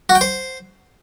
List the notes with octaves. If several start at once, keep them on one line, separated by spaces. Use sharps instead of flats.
F#4
G5
C5